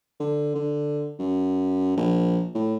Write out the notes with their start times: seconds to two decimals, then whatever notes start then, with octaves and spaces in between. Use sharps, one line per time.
0.20 D3
0.55 D3
1.19 F#2
1.97 A#1
2.55 A2